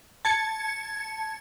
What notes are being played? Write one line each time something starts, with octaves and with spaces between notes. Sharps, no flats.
A5 G#6 C#7